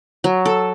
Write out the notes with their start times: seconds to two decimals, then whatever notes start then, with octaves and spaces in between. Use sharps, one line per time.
0.24 F#3
0.46 A4